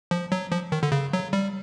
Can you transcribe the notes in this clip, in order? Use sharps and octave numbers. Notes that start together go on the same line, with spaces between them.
F3
F#3
F3
D#3
D3
C#3
F#3
G3